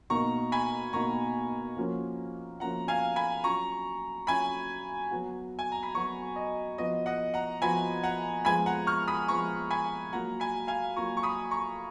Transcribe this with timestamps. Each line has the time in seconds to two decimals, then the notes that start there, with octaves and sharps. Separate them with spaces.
0.10 B2 A#3 D#4 F#4 A#5 C#6
0.52 G#5 B5
0.93 B2 A#3 D#4 F#4 A#5 C#6
1.77 F3 A#3 C#4 F#4
2.60 F3 A#3 C#4 F#4 F#5 A#5
2.88 F5 G#5
3.16 G#5 B5
3.44 F#3 C#4 F4 A#5 C#6
4.27 F#3 C#4 F4 G#5 B5
5.11 F#3 B3 F#4
5.59 G#5
5.72 A#5
5.83 B5
5.95 F#3 B3 F#4 A#5 C#6
6.36 D#5
6.78 F3 B3 F#4 D#5
7.06 D#5 F#5
7.34 F#5 A#5
7.62 F3 B3 F#4 G#5 B5
8.04 F#5 A#5
8.45 F3 G#3 B3 G#5 B5
8.66 F#5 A#5
8.87 C#6 F6
9.08 B5 D#6
9.28 F3 G#3 B3 A#5 C#6
9.70 G#5 B5
10.13 F#3 A#3 F4 F#5 A#5
10.40 G#5 B5
10.68 F5 G#5
10.96 F#3 A#3 F4 A#5 C#6
11.17 C#6
11.23 B5 D#6
11.51 A#5 C#6